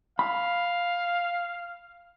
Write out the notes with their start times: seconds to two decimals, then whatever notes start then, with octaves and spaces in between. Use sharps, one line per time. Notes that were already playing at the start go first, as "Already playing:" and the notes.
0.19 F5 B5